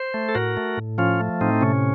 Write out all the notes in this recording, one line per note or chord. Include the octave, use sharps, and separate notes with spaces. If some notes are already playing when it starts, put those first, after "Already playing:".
Already playing: C5
A3
A4
A2 F#4 A#4
A3
A2
F3 C#4 F4
A3
A2 C4 D#4
C3 C#4